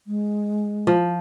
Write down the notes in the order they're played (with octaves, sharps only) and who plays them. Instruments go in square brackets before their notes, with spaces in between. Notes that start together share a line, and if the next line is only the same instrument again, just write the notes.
[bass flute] G#3
[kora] F3